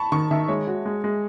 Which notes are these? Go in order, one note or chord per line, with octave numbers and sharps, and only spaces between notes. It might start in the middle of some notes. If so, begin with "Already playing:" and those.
Already playing: A5 B5 C#6
D#3 C#6
D#3 E5
G#3 C#5
F#4
G#3
G#3